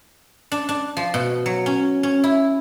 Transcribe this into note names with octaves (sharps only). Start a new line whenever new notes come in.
D4
D4
F3
B2
F#3
C#4
C#4
E4